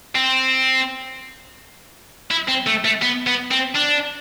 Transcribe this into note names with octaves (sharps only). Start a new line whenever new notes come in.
C4
E4
C4
A3
A3
B3
B3
C4
D4